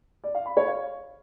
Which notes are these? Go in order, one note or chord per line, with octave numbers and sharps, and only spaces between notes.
D5
F5
B5
C#5
F5